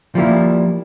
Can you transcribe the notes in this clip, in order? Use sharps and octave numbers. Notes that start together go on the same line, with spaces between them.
F3 G3 A#3 E4